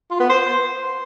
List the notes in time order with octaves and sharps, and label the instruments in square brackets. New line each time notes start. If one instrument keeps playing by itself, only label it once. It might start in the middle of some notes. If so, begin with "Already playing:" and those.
[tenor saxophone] F4
B3
C5